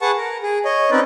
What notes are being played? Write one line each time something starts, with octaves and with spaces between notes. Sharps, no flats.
G#4 B4 F#5 A5 C#6
A#4
G#4
C#5 D#5
C4 C#4 D#4 B4 D5